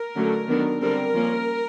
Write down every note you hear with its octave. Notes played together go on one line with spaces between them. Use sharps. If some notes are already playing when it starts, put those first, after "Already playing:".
Already playing: A#4
D3 F#3 A3 C#4
D#3 F#3 B3 D4
D3 G3 C4 A#4
F3 A#3 C#4